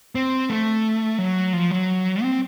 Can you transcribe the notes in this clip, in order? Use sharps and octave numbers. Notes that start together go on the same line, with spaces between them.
C4
A3
F#3
F3
F#3
C4